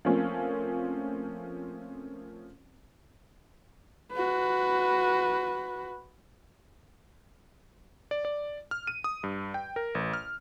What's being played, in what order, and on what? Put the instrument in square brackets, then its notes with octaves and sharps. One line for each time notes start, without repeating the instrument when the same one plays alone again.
[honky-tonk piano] F3 A3 A#3 C4 C#4
[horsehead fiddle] F#4 B4
[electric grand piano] D5
D5
F6
D#7
D#6
G2
G5
A#4
A1
F6